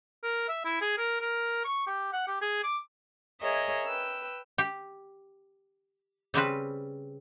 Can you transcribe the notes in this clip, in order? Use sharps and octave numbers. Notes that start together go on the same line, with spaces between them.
A#4
E5
E4
G#4
A#4
A#4
C#6
G4
F#5
G4
G#4
D6
G#4 A#4 C#5 D#5 E5
B4 G5 E6
G4
C#3 G3 C4 B4